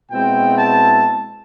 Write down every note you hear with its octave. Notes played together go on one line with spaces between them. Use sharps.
B2 G#3 C4 E4 G5
A5